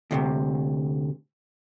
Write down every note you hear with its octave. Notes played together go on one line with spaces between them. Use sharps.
D2 A2 C3